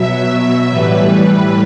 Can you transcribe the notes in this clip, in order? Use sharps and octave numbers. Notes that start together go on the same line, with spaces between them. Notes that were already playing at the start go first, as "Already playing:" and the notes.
Already playing: B2 F#3 E5
A2 E3 G3 B4